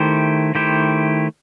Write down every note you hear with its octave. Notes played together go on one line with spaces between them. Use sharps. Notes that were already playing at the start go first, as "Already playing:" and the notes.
Already playing: D#3 A3 E4 G4 C5
D#3 A3 E4 G4 C5